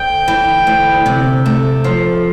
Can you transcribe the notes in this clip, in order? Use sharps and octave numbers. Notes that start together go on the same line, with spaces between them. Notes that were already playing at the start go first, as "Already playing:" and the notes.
Already playing: D2 G5
E3
D2
C3
A3
F3